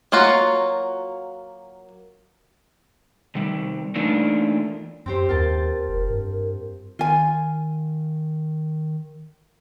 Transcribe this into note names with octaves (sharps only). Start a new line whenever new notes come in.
F#3 A#3 F4 F#4
C3 D#3 G3
E3 A3 A#3 D4 D#4 F4
F#2 C4 G4 C5
D#2 F4 A#4 G5 A5
F1
G2
D#3 F4 G#5